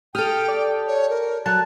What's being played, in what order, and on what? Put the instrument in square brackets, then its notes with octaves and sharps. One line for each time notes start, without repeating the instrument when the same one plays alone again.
[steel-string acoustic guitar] G4 A4 [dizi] G5 [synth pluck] D#6 F6
[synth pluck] D5
[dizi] C#5
A#4
[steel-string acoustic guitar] F#3 [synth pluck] A5 [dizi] F#6